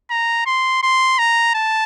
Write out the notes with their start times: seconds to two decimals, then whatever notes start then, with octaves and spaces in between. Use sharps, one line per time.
0.11 A#5
0.47 C6
0.83 C6
1.19 A#5
1.55 A5